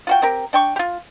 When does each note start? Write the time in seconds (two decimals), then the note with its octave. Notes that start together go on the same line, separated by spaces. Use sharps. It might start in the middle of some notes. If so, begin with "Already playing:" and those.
0.07 F4 F#4 G5
0.22 C4 G4 A#4
0.53 D4 G5 C#6
0.76 F4 G4